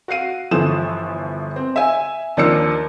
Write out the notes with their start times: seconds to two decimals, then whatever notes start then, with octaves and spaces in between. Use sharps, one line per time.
0.08 F#4 F5 C7 D#7
0.51 G1 E3 F3 A4 D#6 E7
1.56 C4
1.76 E5 G#5
2.37 D#2 F3 D4 A#4 E6 C#7